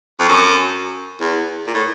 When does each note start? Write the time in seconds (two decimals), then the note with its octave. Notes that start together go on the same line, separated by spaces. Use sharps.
0.19 F2
0.29 F#2
1.20 E2
1.67 A#2
1.74 A2